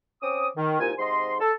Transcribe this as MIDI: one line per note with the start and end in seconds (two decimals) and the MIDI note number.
0.22 0.47 60
0.22 0.47 61
0.22 0.47 86
0.22 0.47 87
0.57 0.76 51
0.80 0.93 36
0.80 0.93 46
0.80 0.93 63
0.80 0.93 80
0.99 1.35 44
0.99 1.35 48
0.99 1.35 75
0.99 1.35 84
1.40 1.52 69